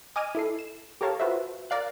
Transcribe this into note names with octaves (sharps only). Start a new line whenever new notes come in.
D#5 G#5 D6 F6 D#7
E4 A4 C7
E7
G4 A4 A#4 C#5 F5 A5
F4 F#4 B4 C5 E5
A#4 D5 F5 F#6